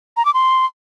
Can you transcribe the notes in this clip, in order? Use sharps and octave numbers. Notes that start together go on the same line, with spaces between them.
A#5
D6
C6